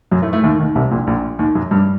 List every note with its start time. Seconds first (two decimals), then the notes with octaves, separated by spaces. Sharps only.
0.12 F#2 F#3
0.23 A2 A3
0.33 A2 A3
0.43 D#2 D#3
0.59 D#2 D#3
0.75 C2 C3
0.91 A#1 A#2
1.07 A#1 A#2
1.39 D#2 D#3
1.55 F#2 F#3
1.71 G2 G3